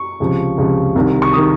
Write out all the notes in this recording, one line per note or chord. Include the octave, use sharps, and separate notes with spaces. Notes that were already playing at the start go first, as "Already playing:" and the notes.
Already playing: C#6
C#2 C3 F3
C#2 C3 F3
C2 C3 D#3
C#6
C3 D#3 D#6